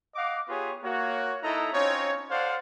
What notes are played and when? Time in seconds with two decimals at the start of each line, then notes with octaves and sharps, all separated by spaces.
0.15 D#5 F5 F#5 D6
0.48 B3 F4 G4 G#4 B4 C#5
0.84 A#3 F#4 C#5
1.43 D#4 E4 A4 D#5 A#5
1.73 C4 C#4 D#4 F4 C#5
2.30 A4 C5 D5 F5 F#5